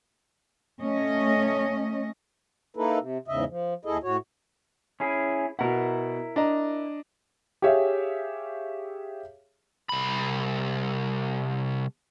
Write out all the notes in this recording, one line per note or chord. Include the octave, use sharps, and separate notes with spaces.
A3 C#4 D#5
A#3 D#4 E4 A4 B4
C3
E2 G#2 C#3 D#5 E5
F3
D#2 E4 G#4 A4 D#5
A2 F#4 C#5
C#4 E4 G#4
B2 E4 A#4 F#5
D4 D#5 A#5
G4 G#4 C#5 E5 F5
C2 B5